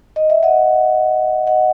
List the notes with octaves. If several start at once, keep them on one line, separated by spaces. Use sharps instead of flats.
D#5
E5
D#5 F#5
D#5 F#5